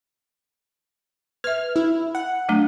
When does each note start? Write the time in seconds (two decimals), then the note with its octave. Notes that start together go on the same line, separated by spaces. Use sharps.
1.44 B4 E5 F6
1.76 E4
2.15 F#5
2.49 F#3 A3 D4